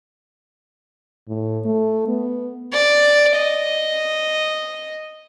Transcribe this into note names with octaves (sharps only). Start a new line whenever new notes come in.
A2
A3
B3
D5
D#5